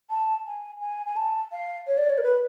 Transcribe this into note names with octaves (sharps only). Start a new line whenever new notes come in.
A5
G#5
G#5
G#5
A5
F5
C#5
D5
C#5
A#4
B4